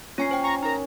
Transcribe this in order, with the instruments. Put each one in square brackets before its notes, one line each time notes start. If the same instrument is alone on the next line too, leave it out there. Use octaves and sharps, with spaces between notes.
[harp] C#4 [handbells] F4 G#5 C7
[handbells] C5 G5
[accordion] A#5 C#6
[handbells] D#4 A#4 [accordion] A#5